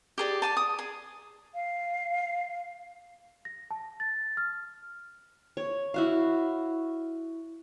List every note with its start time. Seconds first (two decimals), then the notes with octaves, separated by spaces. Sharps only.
0.18 G4 G#4 D5
0.42 D5 G#5 A5
0.57 D#6
0.79 G#4
1.54 F5
3.45 A#6
3.71 A5
4.00 A6
4.37 F6
5.57 C#5
5.94 E4 F#4 F5